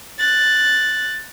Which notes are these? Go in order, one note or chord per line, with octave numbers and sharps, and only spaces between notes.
F#6 A6